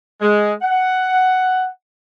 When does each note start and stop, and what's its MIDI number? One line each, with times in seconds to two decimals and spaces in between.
0.22 0.54 56
0.62 1.68 78